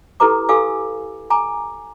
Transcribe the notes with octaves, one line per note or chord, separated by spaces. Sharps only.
E4 G4 A4 B4 A#5 D6
G4 A4 F5 G#5 D6 E6
G#5 A#5 D6